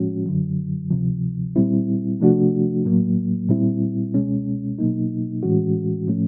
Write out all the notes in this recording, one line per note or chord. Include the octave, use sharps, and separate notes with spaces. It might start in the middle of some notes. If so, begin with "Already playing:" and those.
Already playing: A2 F3 G#3 C#4 F#4
F#2 D3 F#3
D2 C3 F3
A#2 G3 C4 E4
C3 F3 A3 D4 F#4
A2 F#3 A#3
A#2 G3 C4 E4
C#2 B2 G#3 C#4
B2 F#3 A#3 D#4
A2 E3 G#3 C#4 F#4
A2 F3 A3 C#4